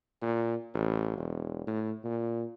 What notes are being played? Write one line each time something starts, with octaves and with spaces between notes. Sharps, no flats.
A#2
A1
E1
A2
A#2